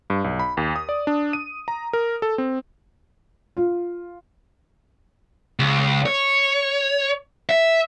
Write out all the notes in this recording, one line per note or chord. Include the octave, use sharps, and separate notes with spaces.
G2
B1
B5
D#2
D#6
D5
D4
D#7
A#5
A#4
A4
C4
F4
C#2
C#5
E5